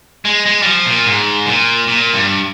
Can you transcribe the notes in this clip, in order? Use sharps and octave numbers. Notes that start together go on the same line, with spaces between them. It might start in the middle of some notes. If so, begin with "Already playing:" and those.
G#3
G#3
G3
F3
A#2
G#2
A#2
A#2
G2